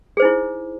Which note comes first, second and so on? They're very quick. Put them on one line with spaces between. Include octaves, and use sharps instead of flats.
G#4 C5 D#4 E4